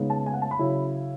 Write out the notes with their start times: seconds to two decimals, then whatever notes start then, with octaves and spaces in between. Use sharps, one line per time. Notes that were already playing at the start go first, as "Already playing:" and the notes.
Already playing: C#3 G#3 B3 D#4
0.10 A5
0.26 G#5
0.34 F#5
0.42 A5
0.51 B5
0.59 C#3 F#3 C#4 E4